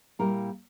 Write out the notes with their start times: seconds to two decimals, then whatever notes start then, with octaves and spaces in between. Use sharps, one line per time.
0.19 A#2 G3 A#3 E4 A#4